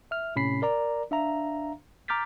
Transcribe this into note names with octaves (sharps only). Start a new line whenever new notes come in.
E5 F6
A2 C3 C#4 B5 B6 C7
A#4 D5 A#5
D4 E5 F5 A#5
A#5 D6 F6 G6 A6 B6